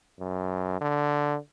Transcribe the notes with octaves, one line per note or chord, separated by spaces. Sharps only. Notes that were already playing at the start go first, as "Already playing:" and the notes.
F#2
D3